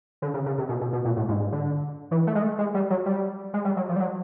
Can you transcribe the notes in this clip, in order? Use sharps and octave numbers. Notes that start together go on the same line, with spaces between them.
D3
C#3
C#3
C3
B2
B2
B2
A#2
A2
G#2
G#2
D3
E3
A3
G#3
A3
G#3
G3
F#3
G3
G#3
G3
F#3
F3
G3
F#3